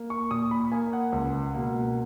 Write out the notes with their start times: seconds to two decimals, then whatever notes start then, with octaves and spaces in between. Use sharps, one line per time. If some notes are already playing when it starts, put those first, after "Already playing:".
Already playing: A#3
0.10 C#6
0.31 A#2 D#6
0.51 B5
0.71 A#3 G#5
0.93 F#5
1.12 C#2
1.54 B2 A#3